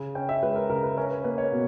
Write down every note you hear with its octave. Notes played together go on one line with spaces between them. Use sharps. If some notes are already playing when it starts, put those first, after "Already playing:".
Already playing: C#3
C#4 G5
E5
G#3 B4
A#4
C#3 A#4
B4
C#4 A#4
B4
A#3 B4
C#5
B2